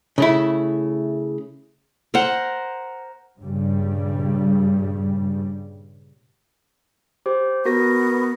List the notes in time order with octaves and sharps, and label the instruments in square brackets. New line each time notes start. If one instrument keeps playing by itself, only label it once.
[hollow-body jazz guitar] C#3 A3 E4
[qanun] A#4 C5 F#5
[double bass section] G2 A#2 C#3 G3
[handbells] G4 C5
[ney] B3 [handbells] F#4 A#4 A#6